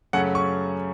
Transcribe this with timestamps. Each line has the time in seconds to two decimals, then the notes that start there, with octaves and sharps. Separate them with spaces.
0.13 F#2 C#3 F#3 A3 C#4 F#5
0.35 C#6